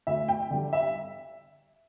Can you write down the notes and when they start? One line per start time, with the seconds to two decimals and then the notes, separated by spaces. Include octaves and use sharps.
0.07 D2 E5
0.28 G5
0.50 D3 G3
0.73 E5